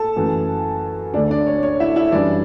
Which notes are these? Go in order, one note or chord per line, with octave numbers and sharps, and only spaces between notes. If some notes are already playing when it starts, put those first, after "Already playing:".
Already playing: A4 A5
F#2 E3 A3
D2 D3 A3 D4 D5
D4 D5
C#5
C#5
E4 E5
E4 E5
F#2 E3 G3 D4 D5